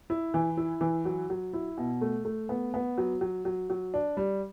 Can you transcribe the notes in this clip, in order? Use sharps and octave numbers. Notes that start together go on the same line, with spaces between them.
E4
E3
E4
E3
F#3
F#3
E4
B2
A3
A3
B3
B3
F#3
F#3
F#3
F#3
D4
G3